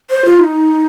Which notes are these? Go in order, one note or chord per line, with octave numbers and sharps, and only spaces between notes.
C5
F4
D#4